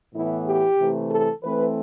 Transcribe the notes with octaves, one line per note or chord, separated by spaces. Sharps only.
A2 E3 B3 E4
G4
C3 E3 A3
A4
E3 A3 C4 B4